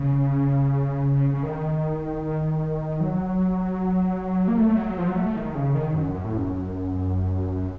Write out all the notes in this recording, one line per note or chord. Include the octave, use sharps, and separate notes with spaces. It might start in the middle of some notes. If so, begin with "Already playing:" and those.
Already playing: C#3
C#3
D#3
F#3
A#3
A3
F#3
F3
F#3
A3
D#3
C#3
D#3
F#2
F#2
A2
F#2